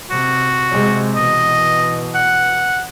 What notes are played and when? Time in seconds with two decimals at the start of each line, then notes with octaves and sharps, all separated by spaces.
0.10 C3 F#4
0.71 C3 G#3
1.16 B2 E3 D#5
2.15 F#5